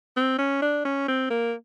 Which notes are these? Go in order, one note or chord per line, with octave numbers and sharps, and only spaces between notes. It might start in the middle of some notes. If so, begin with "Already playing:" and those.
C4
C#4
D4
C#4
C4
A#3